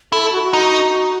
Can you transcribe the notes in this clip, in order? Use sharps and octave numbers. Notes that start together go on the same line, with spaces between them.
E4 A4
A4
F#4
F#4
D#4